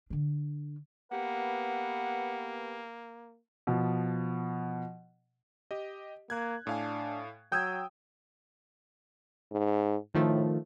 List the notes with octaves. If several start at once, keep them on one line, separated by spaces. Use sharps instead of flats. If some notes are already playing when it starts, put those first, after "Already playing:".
D3 D4
A#3 B3 G4 B4 F#5
B2 F3
G4 D#5
A#3 F#6 G#6
A2 D4 F5 G#5
F#3 G5 D#6 E6 G6 G#6
G#2
A2 D#3 F3 A3